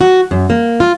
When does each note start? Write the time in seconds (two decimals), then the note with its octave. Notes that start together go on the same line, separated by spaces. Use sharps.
0.01 F#4
0.31 F#2
0.50 A#3
0.80 F4